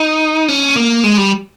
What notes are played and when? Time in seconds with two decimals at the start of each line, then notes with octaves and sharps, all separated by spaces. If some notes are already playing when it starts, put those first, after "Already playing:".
Already playing: D#4
0.48 C#4
0.76 A#3
1.04 G#3
1.17 G3